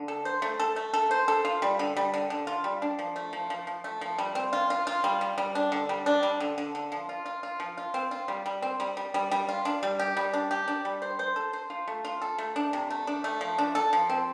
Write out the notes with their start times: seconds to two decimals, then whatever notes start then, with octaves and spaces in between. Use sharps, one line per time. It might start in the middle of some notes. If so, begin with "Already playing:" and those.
Already playing: D3
0.08 A4
0.25 C5
0.42 A3
0.60 A4
0.76 A3
0.94 A4
1.11 C5
1.28 A4
1.45 F4
1.62 G3
1.79 D3
1.97 G3
2.14 D3
2.30 D3
2.47 F4
2.64 G3
2.82 D4
2.99 F3
3.16 A3
3.33 F3
3.50 F3
3.67 F3
3.84 A3
4.01 F3
4.18 G3
4.35 C4
4.53 F4
4.70 F4
4.87 F4
5.04 G3
5.21 G3
5.38 G3
5.55 D4
5.72 D3
5.89 G3
6.06 D4
6.23 G3
6.40 D3
6.58 D3
6.75 D3
6.92 F3
7.09 F4
7.26 F4
7.43 F4
7.60 F3
7.77 F4
7.94 C4
8.11 F4
8.28 G3
8.46 G3
8.62 C4
8.80 G3
8.97 G3
9.14 G3
9.32 G3
9.49 F4
9.65 D4
9.83 G3
9.99 G4
10.17 G3
10.33 D4
10.51 G4
10.68 D4
10.85 G3
11.02 C5
11.19 C5
11.36 A4
11.53 C5
11.70 F4
11.88 A3
12.05 F4
12.22 A4
12.38 A3
12.56 D4
12.73 C3
12.90 A3
13.07 D4
13.24 A3
13.41 F3
13.58 D4
13.75 A4
13.93 F3
14.10 C4